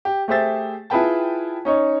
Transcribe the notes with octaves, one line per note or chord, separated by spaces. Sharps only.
G4
A3 G4 G#4 C5 E5 A6
E4 F4 G#4 B4 G5 A5
C#4 D#4 C#5